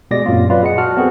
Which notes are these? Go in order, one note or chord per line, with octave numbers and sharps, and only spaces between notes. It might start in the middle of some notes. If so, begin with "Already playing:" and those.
B2 G#3 G4 D5 D#5 A#6
F#2 A#2 F#3 C4 F4
F#3 F4 B4 D5
G#4 D#5 F#5 C#7
F#4 F#5 A5 F6
B3 C4 F#4 G#4 A4 C5